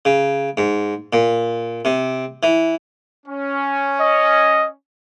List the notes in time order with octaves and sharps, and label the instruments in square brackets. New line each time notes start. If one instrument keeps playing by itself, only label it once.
[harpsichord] C#3
G#2
A#2
C3
E3
[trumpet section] C#4
[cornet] D#5